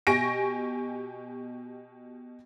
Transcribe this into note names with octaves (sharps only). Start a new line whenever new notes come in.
B2 G4 G#5 C#6 A#6 D7